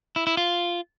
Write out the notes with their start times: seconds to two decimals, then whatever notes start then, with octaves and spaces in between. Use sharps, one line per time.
0.16 E4
0.27 E4
0.37 F4